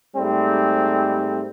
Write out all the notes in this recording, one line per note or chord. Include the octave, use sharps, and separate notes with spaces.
G#2 G3 A3 C4